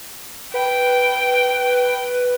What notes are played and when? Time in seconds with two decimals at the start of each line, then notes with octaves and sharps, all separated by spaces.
0.54 B4 G5